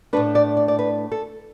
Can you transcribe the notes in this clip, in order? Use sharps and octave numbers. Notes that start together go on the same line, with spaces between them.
A2 A3 D4 B4
D5
D5
D5
B4
A4